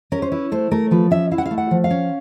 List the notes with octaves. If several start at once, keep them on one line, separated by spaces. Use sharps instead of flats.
C#4 A#4
C5
E4 B4
A3 C5
A3 A#4
F3 B4
C#4 E5
E4 F5
F#5
F5
A3
F#5
F3
F5
C#4